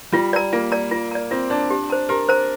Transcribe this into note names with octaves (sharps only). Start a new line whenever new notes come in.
G3 F4
D5 A#5
A#3 F4
D5 A#5
F4
D5 A#5
C4 F4
D4 D5 A#5
G4
C5 A#5
G4 A#4
C5 A#5